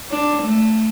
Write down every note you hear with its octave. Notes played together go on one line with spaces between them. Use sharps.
D4
A3